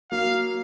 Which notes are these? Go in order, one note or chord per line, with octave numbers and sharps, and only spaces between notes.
F#3 A#3 F5